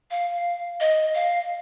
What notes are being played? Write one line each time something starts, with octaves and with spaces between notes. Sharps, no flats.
F5
D#5
F5